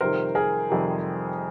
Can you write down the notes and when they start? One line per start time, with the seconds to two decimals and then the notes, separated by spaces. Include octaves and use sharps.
0.01 F2 C3 D#3 G3 A#4 C5
0.35 G#4 A#4
0.70 F2 C3 D#3 G3